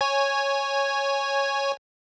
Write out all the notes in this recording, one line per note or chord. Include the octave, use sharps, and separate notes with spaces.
C#5 G#5